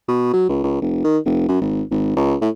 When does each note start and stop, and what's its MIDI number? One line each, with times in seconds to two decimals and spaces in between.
0.09 0.33 47
0.34 0.45 54
0.49 0.62 37
0.64 0.78 37
0.81 1.03 29
1.04 1.18 51
1.25 1.44 29
1.48 1.61 42
1.61 1.82 32
1.91 2.13 32
2.16 2.35 37
2.42 2.49 45